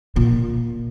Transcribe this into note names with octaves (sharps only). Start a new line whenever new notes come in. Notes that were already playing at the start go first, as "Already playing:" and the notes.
A#2